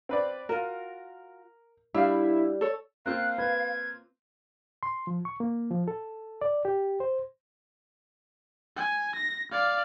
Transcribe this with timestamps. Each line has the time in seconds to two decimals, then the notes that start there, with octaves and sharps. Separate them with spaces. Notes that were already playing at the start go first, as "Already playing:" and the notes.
0.09 C4 B4 D5
0.49 F4 F#4 A#4
1.94 G3 D4 E4 E5 F5
2.61 A4 C#5
3.06 A#3 C4 F4 F5 F#6
3.38 B4 G#6
4.83 C6
5.07 F3
5.25 C#6
5.40 A#3
5.71 F3
5.88 A4
6.41 D5
6.65 G4
7.00 C5
8.77 G#5
9.16 A#6
9.52 D5 F5